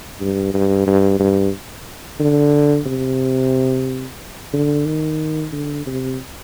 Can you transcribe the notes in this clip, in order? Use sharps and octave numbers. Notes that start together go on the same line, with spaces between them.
G2
G2
G2
G2
D3
C3
D3
D#3
D3
C3